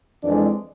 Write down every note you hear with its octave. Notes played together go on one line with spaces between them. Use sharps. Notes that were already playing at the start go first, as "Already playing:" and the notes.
F2 E3 G#3 D4 D5